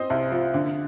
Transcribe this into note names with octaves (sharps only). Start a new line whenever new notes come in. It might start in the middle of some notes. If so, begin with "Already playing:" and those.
Already playing: C4 C5 D#5
C2
F3
D3